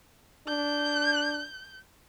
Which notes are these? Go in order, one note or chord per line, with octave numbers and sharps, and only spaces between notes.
D4 G6